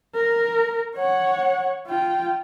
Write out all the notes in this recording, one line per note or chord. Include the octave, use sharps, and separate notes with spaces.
A#4
C#5 F#5
F4 G5